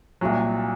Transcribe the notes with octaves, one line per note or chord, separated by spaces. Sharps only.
C2 A#2 F#3